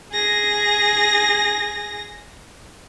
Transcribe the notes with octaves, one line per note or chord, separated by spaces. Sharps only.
G#4 A#6